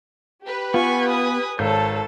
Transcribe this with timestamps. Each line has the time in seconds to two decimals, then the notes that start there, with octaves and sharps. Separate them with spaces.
0.43 G4 B4
0.74 B3 F4 G#5 C#6
1.09 G#5 D#6
1.59 G#1 A4 C#5 A5 G6